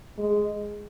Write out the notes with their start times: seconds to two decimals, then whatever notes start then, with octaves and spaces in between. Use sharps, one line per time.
0.19 G#3